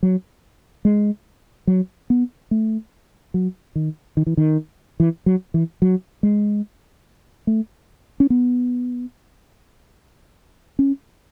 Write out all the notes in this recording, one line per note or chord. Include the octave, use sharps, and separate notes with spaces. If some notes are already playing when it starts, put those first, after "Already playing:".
F#3
G#3
F#3
B3
A3
F#3
D#3
D#3
E3
D#3
E3
F#3
E3
F#3
G#3
A3
C#4
B3
C#4